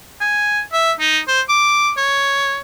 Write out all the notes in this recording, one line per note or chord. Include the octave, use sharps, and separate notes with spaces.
G#5
E5
D#4
C5
D6
C#5